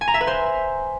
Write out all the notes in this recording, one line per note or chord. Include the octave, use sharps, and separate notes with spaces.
G#5
A#5
E5
B4
C5